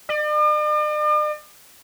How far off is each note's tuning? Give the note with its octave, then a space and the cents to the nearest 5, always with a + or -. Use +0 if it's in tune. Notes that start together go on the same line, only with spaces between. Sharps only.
D5 +45